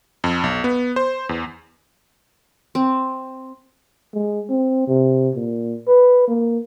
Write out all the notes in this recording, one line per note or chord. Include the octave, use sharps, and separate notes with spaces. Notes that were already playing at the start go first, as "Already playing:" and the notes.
F2
B1
B3
C5
E2
C4
G#3
C4
C3
A#2
B4
A#3